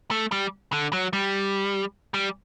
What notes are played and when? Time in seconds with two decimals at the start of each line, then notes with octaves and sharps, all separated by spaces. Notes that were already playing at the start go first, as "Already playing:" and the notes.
0.11 A3
0.32 G3
0.72 D3
0.93 F#3
1.13 G3
2.14 G3